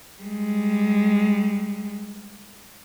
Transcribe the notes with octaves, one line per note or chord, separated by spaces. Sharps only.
G3 G#3